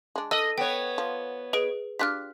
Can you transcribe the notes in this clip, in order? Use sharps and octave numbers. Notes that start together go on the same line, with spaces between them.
G#3 D4
D4 A4 D#5 E6
B3 C#5 G5
F3
G#4 B4 D#5 D7
D4 F4 G4 F6 F#6 B6